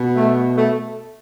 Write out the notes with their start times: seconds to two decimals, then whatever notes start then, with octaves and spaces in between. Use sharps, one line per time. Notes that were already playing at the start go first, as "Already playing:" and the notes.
Already playing: B2
0.16 A3
0.56 A3